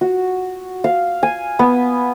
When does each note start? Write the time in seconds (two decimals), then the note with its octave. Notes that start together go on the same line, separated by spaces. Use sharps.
0.01 F#4
0.84 F5
1.23 G#5
1.59 B3